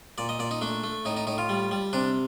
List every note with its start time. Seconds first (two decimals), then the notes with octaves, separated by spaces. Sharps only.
0.18 A#2 D5
0.29 D#5
0.39 A#2 D5
0.51 D#4
0.61 A3 D4
0.83 A3
1.05 A2 D#4
1.17 D#4
1.27 A2 D#4
1.38 F4
1.49 G3
1.71 G3
1.93 C3 D4